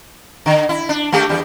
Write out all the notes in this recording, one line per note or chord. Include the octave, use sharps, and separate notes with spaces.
D3
E4
D4
A3 A#3 G4
E2 G3